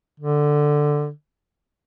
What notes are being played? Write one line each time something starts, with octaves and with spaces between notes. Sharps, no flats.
D3